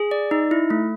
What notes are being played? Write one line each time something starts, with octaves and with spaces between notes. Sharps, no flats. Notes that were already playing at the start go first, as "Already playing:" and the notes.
Already playing: G#4
D5
D#4
E4
A3